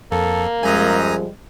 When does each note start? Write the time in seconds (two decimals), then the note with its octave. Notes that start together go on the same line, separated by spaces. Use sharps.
0.12 F2 A#3 A4
0.63 F#2 F3 G3 G#3 G#5 A#5 D#6